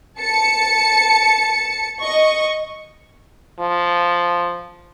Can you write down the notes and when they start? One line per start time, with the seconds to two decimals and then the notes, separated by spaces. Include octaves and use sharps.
0.19 A5 C#7
2.01 D#5 C#6
3.59 F3